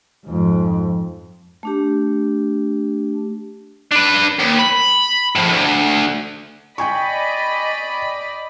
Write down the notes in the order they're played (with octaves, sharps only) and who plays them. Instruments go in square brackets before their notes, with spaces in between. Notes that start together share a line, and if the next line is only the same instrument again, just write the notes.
[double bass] F2 G#2
[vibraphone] A3 D4 G4
[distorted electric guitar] D4 B4
D#2
B5
A2 F3
D2
[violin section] D5 D#5 B5 [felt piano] G5 G#5 C#6